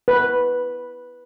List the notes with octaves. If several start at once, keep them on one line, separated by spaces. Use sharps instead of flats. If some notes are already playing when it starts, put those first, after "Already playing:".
B4